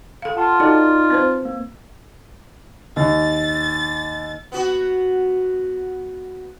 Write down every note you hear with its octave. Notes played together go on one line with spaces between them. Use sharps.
A4 F5
F4 F#5 A5 C6
D#4 F#4 A4 D5 D#5
C4 B4 C5
A#3
D#2 A6
B3 F#4